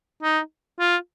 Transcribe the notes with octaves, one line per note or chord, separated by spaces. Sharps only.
D#4
F4